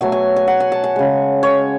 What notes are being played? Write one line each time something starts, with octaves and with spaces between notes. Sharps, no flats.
B2 F#3 A3 G#5
G#5
G#5
F#5
G#5
A5
G#5
C#3 G#3
C#5